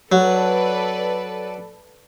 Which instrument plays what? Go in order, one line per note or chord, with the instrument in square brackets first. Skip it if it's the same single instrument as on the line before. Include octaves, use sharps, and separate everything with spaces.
[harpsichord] F#3 [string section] A4 B4 D5